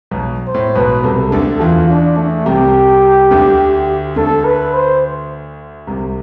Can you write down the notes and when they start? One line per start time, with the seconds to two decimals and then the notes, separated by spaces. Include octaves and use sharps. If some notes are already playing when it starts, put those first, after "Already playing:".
0.11 B1 B2
0.47 C5
0.54 A2
0.75 B1 B2 B4
1.04 C2 C3 A4
1.32 D2 D3 A4
1.61 E2 E3 F4
1.90 D4
2.17 A3
2.46 C2 C3 G4
3.31 D2 D3
4.16 D2 D3 A4
4.45 B4
4.74 C5
5.87 C2 C3